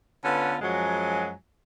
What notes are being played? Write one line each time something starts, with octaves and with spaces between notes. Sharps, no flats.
D3 B3 C#4 F4 B4
F#2 F3 F#3 G#3 G#5